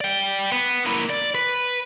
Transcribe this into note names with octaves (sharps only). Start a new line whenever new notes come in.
D5 G5
B3
A#3 E4
D5
B4